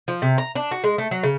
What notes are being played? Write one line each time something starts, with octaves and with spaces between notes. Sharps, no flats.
F3
C3
A#5
D4
F#4
G#3
A3
F#3
C#3